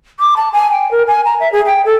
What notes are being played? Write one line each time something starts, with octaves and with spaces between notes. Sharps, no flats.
D6
A5
G#5
G5
A#4
G#5
A#5
E5
G#4
G5
A4